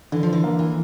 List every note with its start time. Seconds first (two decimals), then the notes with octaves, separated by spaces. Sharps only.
0.12 D3 E3
0.23 F3
0.33 E3
0.44 A#3
0.59 E3